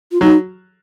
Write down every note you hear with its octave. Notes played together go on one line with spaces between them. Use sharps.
F4
F#3 D#4